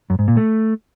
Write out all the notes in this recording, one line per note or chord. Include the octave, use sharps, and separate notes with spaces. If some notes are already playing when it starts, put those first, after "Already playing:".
F#2
G#2
A#2
A3